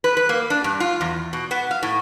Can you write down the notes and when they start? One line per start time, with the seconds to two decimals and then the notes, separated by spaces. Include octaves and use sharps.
0.04 B4
0.17 B4
0.29 A#3
0.50 D4
0.64 G2
0.80 F4
1.01 E2
1.33 B2
1.51 B3
1.71 F5
1.83 A2